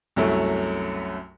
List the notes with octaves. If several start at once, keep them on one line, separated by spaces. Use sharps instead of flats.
C2 F#2 F#3 A3